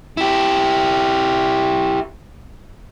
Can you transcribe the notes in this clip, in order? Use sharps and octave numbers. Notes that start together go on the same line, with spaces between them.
E4 G4